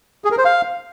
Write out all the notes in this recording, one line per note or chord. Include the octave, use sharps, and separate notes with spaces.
G#4
A#4
C5
F5